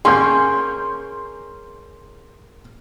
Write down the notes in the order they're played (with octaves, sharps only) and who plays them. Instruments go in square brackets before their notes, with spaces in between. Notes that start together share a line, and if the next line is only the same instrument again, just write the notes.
[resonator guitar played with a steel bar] A#3 C#4 G#4 [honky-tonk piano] C6 G6